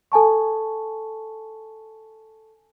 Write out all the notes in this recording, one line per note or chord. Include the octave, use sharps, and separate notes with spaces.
A4 G#5 A5 C#6